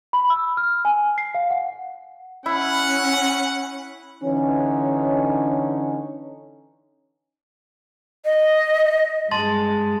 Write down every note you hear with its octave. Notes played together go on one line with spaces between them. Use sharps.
B5
E6
F6
G#5
C7
F5
F#5
C#4 E4 F#5
D3 E3 C#4 D#4 C#5
D#5
G2 G#3 A5 C6 A6